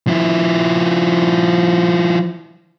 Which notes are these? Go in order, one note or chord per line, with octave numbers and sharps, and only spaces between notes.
F3 E4